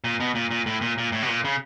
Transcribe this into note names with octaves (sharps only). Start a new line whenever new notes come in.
A#2
B2
A#2
A#2
A2
A#2
A#2
A2
B2
A#2
C#3